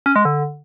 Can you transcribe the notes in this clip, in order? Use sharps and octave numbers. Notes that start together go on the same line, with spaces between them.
C#4
G#3
D3